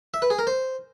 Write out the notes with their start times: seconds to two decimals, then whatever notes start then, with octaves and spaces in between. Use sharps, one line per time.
0.14 E5
0.22 B4
0.30 G#4
0.39 A#4
0.47 C5